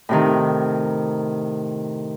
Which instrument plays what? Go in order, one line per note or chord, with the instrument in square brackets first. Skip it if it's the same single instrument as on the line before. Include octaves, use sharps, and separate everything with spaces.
[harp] A2 C3 D#3